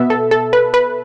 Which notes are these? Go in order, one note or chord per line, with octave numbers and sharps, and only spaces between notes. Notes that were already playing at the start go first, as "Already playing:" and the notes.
Already playing: B2 B3 E5
A4
A4
B4
B4